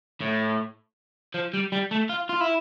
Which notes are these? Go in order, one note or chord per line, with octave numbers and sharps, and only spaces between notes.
A2
F3
G3
G3
A3
F4
F4
E4